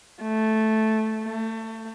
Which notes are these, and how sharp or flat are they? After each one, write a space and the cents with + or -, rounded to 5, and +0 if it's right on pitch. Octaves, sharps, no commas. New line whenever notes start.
A3 -5
A3 +25